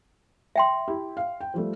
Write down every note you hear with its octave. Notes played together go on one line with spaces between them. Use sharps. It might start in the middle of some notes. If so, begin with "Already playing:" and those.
E5 G5 C6
E4 G4
F5
G5
F3 G3 A3